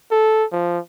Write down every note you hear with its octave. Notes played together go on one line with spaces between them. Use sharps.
A4
F3